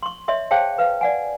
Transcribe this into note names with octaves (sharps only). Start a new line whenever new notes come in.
C6 C#6
C#5 D#5 E5 C6
G#4 C5 C#5 F5 G5 A5
B4 F5
D5 F#5 G#5